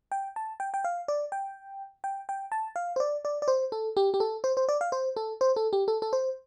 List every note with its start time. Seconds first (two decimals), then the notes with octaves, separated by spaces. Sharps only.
0.12 G5
0.36 A5
0.60 G5
0.74 G5
0.84 F5
1.08 D5
1.32 G5
2.04 G5
2.29 G5
2.52 A5
2.76 F5
2.96 C5
3.00 D5
3.25 D5
3.42 D5
3.48 C5
3.72 A4
3.97 G4
4.14 G4
4.20 A4
4.44 C5
4.57 C5
4.69 D5
4.81 F5
4.92 C5
5.17 A4
5.41 C5
5.56 A4
5.73 G4
5.88 A4
6.02 A4
6.13 C5